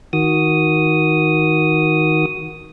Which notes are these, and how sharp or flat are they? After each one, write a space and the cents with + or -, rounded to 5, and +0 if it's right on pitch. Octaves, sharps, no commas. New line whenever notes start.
D#3 +20 F#4 +0 D#6 +0